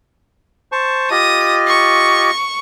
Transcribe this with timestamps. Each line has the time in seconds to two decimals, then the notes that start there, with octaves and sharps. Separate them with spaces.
0.72 C5 A5 C#6
1.11 F4 G4 D#5 D#6
1.68 C#6